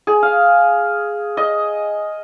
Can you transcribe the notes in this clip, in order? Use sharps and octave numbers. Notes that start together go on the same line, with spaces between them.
G#4
F5
D#5